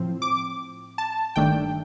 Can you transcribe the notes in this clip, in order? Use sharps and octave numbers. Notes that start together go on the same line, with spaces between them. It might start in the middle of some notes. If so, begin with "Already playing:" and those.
Already playing: A2 F3 C4
D6
A5
G1 G2 D#3 A3 D4 G5